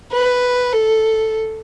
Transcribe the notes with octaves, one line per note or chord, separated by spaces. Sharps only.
B4
A4